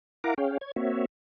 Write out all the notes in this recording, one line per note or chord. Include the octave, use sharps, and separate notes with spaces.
E4 A#4 F5 F#5 A#5 D6
C#4 G#4 C#5 F5 G5
C#5 G#6
A#3 C4 F#4 C#5 E5